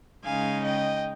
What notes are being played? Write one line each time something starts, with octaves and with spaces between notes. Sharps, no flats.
C#3 G#3 D#4 F5 G#5
D#5 G5